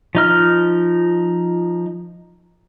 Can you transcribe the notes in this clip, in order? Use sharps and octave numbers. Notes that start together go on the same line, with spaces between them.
F3 D#4 F6